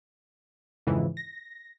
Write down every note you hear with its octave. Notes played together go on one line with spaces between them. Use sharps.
F2 G#2 C#3 E3
A#6